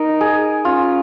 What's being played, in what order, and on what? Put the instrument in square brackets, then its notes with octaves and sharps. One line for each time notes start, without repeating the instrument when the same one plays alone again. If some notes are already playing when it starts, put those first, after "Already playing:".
Already playing: [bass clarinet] D#4 [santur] A#4
[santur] G#4
[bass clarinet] C#4 [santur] F4